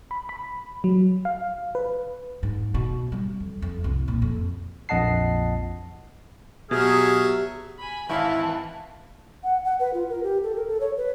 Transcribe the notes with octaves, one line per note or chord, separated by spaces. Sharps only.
B5
B5
F#3
F5
B4
G#2
B2
G3
F2
F2
C2
A#2
F2
A#1 F2 D#5 F#5 A5 C7
B2 F#3 G4 G#4 E5 F6
G#5 B5
G#1 E3 E4 F5 A5
F#5
F#5
B4
F4
A#4
G4
A4
A#4
A4
C#5
B4